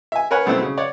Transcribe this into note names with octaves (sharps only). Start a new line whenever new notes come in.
E5 G#5
A#4 B4 C#5 F#5 G#5
F#2 B2 A3 B3 C4 E4
C#3
C#5 D5 F#5